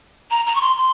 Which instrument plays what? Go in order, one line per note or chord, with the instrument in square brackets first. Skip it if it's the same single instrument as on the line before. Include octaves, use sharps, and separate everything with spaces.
[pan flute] A#5
A#5
C#6
C6
C6